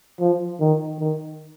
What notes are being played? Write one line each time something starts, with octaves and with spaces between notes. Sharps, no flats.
F3
D#3
D#3